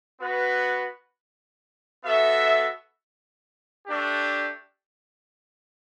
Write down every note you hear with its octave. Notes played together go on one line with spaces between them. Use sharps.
B3 F#4 B4
B3 F#4 A4 E5
A3 D4 G4